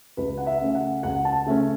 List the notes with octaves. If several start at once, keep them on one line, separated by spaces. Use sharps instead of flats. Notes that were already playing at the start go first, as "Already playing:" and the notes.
C#2 B4
F#5
E5
C#3 A3 C#4
F#5
C#2 F#5
A5
C#3 A3 C#4